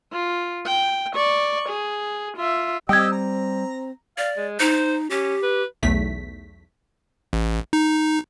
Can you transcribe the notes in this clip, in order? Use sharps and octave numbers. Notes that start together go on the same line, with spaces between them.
F4
G5
D5 C#6
G#4
F4 E5
G3 C4 G4 D#5 G5 E6 G#6
A#5
D5 F5
G#3
D#4 C5
C#4 G4
B4
B1 E2 A3 B6
A1
D#4